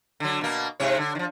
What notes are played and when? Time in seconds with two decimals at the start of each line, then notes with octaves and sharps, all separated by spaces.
0.20 D3 F#3
0.41 B2 A#3
0.80 G#2 C3 C#5
0.97 D3
1.15 D#3 F3